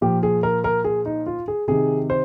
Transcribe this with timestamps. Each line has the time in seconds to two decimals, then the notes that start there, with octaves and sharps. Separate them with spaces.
0.01 A#2 F3 G4
0.23 G#4
0.43 A#4
0.64 A#4
0.84 G#4
1.06 D#4
1.26 F4
1.48 G#4
1.68 C3 D#3 G#4
2.10 C5